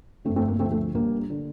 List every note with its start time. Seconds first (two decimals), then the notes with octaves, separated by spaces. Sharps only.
0.25 G1 F2 D3 A3 C4
0.36 A3 C4
0.48 A#3
0.59 D2 D3 F3 A3 C4
0.72 A3
0.94 A#1 A#2 G3 A#3
1.30 D3